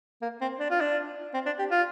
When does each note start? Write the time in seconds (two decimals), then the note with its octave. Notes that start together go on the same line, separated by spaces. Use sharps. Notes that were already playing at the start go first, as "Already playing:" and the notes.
0.22 A#3
0.41 C4
0.59 D4
0.70 F4
0.81 D4
1.34 C4
1.46 D4
1.59 G4
1.71 F4